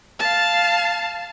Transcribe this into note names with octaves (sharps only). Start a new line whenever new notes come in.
F5 A5